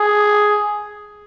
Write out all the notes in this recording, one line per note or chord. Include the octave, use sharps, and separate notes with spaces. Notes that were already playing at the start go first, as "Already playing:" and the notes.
Already playing: G#4